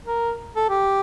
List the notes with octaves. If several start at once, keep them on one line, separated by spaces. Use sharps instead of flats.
A#4
A4
G4